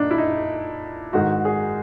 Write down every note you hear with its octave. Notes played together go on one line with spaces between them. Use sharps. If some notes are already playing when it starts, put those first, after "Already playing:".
Already playing: A#2 D4 D#4
E4
D#4
G#2 D#3 G#3 F#4
G#4